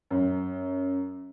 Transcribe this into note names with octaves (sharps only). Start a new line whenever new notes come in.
F#2